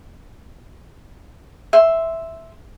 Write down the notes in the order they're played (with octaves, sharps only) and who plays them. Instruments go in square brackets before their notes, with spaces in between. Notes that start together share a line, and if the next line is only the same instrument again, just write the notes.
[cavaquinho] E5 C6